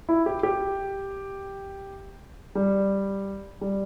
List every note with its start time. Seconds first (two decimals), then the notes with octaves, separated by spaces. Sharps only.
0.09 E4
0.26 G4
0.43 G4
2.55 G3
3.61 G3